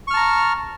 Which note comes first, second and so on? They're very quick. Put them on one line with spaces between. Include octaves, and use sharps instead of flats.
C#6 F6 A5 A#5